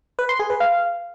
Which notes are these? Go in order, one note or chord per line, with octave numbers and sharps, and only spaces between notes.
B4
C6
G#4
B4
F5